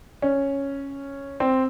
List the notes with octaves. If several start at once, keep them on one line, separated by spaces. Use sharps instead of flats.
C#4
C4